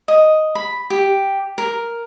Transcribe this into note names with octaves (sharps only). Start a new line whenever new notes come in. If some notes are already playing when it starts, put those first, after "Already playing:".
D#5
B5
G4
A#4